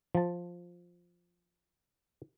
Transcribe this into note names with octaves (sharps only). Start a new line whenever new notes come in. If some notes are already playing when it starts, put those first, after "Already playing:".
F3 A5